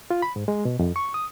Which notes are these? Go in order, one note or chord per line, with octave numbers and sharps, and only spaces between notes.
F4
B5
G#2
G#3
B2
F2
C#6
D#6